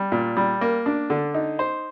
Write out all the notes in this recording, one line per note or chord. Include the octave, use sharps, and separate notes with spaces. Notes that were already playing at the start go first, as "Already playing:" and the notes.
Already playing: G3
A#2
G3
A#3
D4
D3
D#4
C5